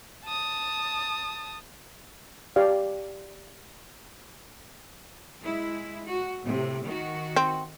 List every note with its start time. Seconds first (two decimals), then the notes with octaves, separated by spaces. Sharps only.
0.24 A5 D#6
2.56 G4 D5 F5
5.41 G#3 E4
6.06 F#4
6.44 A2 C3
6.85 D#3 F#4
7.36 C4